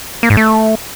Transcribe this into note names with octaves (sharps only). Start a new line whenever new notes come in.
A#3
G#2
A3